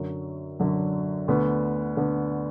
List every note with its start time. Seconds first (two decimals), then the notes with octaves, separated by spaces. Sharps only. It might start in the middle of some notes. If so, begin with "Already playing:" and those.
Already playing: F#2 D3 F#3
0.60 F#2 D3 F#3
1.28 D2 D3 B3
1.97 D3 B3